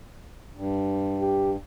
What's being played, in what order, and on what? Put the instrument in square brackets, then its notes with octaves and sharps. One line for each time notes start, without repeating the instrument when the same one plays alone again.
[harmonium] G2
[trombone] G4